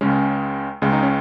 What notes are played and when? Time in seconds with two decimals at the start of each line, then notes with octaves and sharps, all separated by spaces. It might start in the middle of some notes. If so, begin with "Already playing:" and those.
0.01 C#2 C#3 G#3 C#4
0.82 C#2 C#3 G#3
0.93 D#4
1.03 C#4